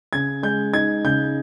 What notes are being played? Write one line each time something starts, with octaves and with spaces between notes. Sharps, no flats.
C#3 G#6
G#3 G6
D#4 G#6
C#3 G6